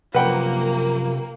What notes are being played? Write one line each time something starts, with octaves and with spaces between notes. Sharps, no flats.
F#2 C3 F3 A#3 B4 F#5 G5